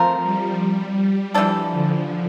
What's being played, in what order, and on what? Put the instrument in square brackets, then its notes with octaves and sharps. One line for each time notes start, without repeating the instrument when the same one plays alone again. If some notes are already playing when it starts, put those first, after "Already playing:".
Already playing: [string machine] F3 [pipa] A3 C4 F4 A#4
[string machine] G3
[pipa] E3 G3 D4 A4 [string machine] F3
[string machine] D3